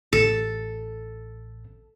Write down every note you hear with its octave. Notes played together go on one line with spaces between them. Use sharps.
A1 A4